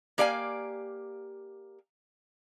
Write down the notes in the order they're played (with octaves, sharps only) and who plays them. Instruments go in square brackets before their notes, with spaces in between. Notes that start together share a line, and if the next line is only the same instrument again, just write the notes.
[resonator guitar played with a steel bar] A#3 G4 D5 F5 F#5 G#5